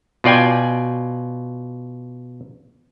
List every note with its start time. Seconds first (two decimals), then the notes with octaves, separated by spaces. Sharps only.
0.24 B2 F4 D5 G5 G#5